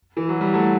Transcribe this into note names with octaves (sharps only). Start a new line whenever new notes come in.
E3
F#3
G3
F#3 A3